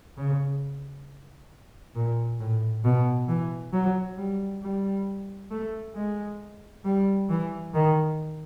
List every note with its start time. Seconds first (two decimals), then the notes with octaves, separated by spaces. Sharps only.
0.17 C#3
1.95 A#2
2.40 A2
2.84 B2
3.28 E3
3.73 F#3
4.17 G3
4.62 G3
5.51 A3
5.95 G#3
6.85 G3
7.29 E3
7.74 D#3